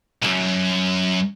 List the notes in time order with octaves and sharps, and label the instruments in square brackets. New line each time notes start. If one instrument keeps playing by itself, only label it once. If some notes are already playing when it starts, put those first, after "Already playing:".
[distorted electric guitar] B1 F#2